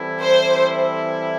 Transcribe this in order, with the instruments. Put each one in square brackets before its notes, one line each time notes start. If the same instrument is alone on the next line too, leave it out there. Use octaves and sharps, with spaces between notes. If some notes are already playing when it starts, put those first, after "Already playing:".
Already playing: [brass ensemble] E3 G3 C4 E4 A4
[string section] C5